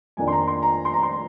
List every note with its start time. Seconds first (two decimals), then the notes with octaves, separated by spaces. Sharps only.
0.17 F2 D#3 A#3 D4 G#5
0.27 C6
0.32 A#5
0.48 C6
0.62 A#5
0.85 C6
0.94 A#5
1.03 C6